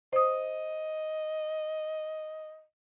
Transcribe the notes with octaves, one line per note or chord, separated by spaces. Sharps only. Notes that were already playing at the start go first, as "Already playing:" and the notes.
C5 D#5 D#6